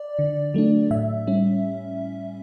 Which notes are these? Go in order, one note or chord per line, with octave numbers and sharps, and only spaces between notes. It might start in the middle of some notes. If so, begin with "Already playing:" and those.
Already playing: D5
D3
F#3 A3 D4
A2 E5
G3 C#4